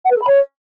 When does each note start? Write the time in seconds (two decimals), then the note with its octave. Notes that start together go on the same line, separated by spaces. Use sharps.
0.05 F#5
0.10 B4
0.16 A4
0.22 B5
0.27 C#5